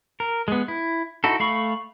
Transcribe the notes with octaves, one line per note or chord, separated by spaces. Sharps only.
A#4
G#3 B3
E4
D#4 E4 F#4 A4
A3 F5 B5 C#6